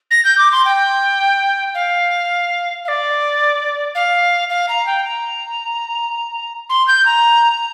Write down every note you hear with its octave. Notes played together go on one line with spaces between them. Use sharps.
A#6
G6
D6
C6
G5
F5
F5
D5
F5
F5
A#5
G5
A#5
C6
G6
A#5